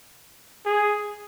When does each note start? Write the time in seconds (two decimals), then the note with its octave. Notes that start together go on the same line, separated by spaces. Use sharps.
0.66 G#4